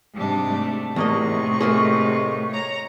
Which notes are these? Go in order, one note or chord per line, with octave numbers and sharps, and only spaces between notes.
G#2 C3 G3 D4
A3
E2 A2 C3 A#3 D#4 D#5 C#6
A3 A#3 G#4
C#5 A#5